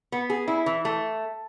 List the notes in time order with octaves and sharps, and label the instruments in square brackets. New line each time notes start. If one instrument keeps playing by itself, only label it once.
[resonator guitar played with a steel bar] B3
G#4
E4
E3
A3